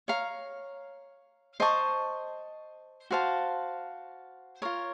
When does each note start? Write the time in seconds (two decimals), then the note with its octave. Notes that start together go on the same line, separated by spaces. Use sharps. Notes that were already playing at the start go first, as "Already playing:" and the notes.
0.08 C#5 F5 A#5
1.60 C5 D#5 A5 C#6
3.10 F#4 C5 F5 A5
4.62 F4 A#4 C#5